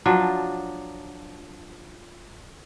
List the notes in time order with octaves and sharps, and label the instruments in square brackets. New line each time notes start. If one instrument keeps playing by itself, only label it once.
[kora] F3 F#3 D4